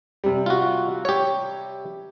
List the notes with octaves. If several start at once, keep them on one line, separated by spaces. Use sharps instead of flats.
C3 G3
F4 F#4
G4 C#5